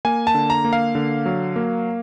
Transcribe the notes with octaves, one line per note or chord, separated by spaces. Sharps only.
A#3 G#5
A5
D3
A#5
A#3
F5
D3
F#3
A#3